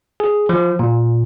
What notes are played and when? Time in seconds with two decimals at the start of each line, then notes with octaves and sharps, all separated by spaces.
0.20 G#4
0.49 F3
0.79 A#2